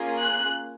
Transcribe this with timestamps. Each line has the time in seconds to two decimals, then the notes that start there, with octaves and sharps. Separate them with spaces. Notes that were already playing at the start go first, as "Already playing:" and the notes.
Already playing: A#3 C#4 F4 G#4
0.20 F#6